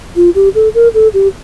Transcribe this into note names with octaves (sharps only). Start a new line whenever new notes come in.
F4
G4
A4
A#4
A4
G4